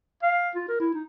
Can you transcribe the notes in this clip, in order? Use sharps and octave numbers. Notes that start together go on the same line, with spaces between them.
F5
F4
A#4
E4
D#4